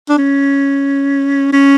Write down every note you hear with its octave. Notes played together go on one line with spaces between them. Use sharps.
D4
C#4
C#4